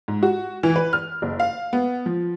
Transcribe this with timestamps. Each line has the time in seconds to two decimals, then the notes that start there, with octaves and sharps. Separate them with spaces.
0.08 G#2
0.23 F#4
0.63 E3
0.76 B4
0.93 F6
1.22 F#1
1.40 F5
1.73 B3
2.06 F3